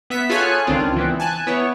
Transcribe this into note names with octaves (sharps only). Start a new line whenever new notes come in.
B3 E5 B6
F4 G#4 A4 C#5 G#5 F#6
C#2 D#3 C4 D4 F4
E3 B3 C4
G#5 A5 F#6
B3 E4 C#5